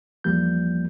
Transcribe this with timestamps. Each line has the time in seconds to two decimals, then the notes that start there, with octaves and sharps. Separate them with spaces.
0.24 E2 F3 G3 A#3 G6